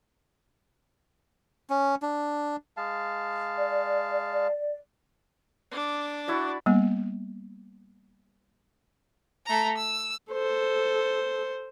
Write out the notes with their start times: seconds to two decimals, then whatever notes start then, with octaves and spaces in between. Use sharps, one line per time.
1.70 C#4
2.02 D4
2.77 G#3 F5 A5
3.55 D5
5.72 D4 D6
6.28 E4 F#4 D5
6.66 G3 A#3 B3
9.46 A3 A#5
9.78 E6
10.33 A4 C5